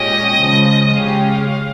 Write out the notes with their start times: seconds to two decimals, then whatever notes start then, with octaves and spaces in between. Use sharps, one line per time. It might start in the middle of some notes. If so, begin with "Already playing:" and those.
Already playing: A#2 G#3 C#4 G4 D#5
0.37 C#3 F3 G#3
0.94 C#3 G#3 C#4 G4 F5